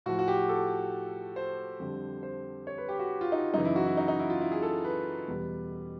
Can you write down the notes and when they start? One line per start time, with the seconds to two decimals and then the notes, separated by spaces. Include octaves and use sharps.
0.06 A2 F3 F#4
0.19 F#4
0.28 G4
0.49 A4
1.36 C5
1.80 F2 D3 G3
2.23 C5
2.67 C#5
2.78 B4
2.89 G4
2.99 F#4
3.21 F4
3.32 D#4
3.53 F#2 C#3 E3 D#4
3.65 E4
3.76 F#4
3.86 E4
3.97 D#4
4.08 D#4
4.19 E4
4.30 F4
4.41 E4
4.52 G#4
4.62 A4
4.84 B4
5.28 E2 B2 G3